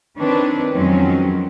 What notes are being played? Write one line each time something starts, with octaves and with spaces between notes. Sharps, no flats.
D#3 C4 D4 B4 C#5
F2 D#3 F#3 G#3 C4 C#4